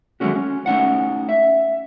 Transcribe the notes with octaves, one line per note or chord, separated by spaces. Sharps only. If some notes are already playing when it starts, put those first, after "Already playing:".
D#3 F#3 G#3 A3 C#4 F#4
C#4
A3 C#4 D#4 F#5
E5